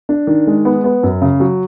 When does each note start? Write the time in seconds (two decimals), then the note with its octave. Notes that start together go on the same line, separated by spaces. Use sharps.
0.09 D4
0.27 D#3
0.47 G#3
0.65 B3
0.84 B3
1.03 F#2
1.22 C#3
1.40 F#3